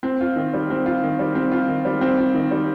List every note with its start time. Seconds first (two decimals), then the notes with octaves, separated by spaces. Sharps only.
0.03 C4
0.21 F4
0.36 D#3
0.53 G3
0.70 C4
0.86 F4
1.03 D#3
1.19 G3
1.35 C4
1.52 F4
1.68 D#3
1.85 G3
2.01 C4
2.18 F4
2.35 D#3
2.51 G3